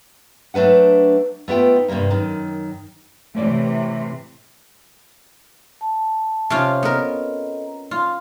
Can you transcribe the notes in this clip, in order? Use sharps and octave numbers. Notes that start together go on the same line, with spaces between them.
F#3 A3 D4 B4 F#5
A3 B3 F4 G5
D#4
G2 C3 D#3 G3 A#3
F#2 D#3
A2 C3 E3 A3 C#5 D5
A5
C3 C#4 F4
B3 A4 A#4 D#5 A#5
F4 C6